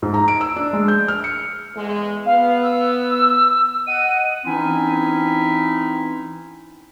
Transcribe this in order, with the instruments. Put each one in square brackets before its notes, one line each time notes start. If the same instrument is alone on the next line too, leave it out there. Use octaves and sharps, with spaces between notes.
[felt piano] G#2
A#5
D7
E6
D4
G#3
G6
F6
C#7
[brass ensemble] E2 G#3
[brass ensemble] B3 [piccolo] F5
[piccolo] E6
[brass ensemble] D#5 F#5 [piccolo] D#7
[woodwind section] E3 C4 C#4 D#4 E4